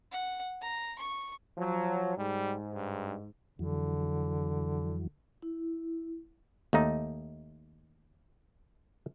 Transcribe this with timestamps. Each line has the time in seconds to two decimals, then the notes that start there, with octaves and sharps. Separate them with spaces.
0.12 F#5
0.62 A#5
0.99 C#6
1.58 F3 F#3
2.17 G#2 G3
2.75 G2
3.59 F2 D3 E3 F#3
5.42 E4
6.73 D#2 A3 D#4